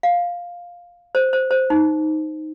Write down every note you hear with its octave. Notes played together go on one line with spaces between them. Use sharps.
F5
C5
C5
C5
D#4